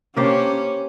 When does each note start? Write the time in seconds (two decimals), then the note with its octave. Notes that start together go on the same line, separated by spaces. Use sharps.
0.16 A#3 C#4 D4 G4 C5